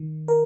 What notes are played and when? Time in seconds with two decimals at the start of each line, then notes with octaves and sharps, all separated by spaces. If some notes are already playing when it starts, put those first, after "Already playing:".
Already playing: D#3
0.28 A#4